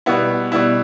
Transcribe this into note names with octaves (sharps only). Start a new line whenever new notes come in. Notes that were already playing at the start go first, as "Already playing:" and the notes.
B2 G3 B3 E4
B2 G3 B3 E4